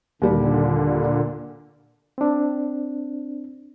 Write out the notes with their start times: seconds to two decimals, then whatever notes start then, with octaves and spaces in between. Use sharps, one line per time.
0.22 D#2 A#2 D3 G3
2.18 C4 D4